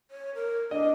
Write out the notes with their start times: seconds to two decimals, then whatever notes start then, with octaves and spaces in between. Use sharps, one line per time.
0.11 C#5
0.35 A#4
0.71 D4 D#5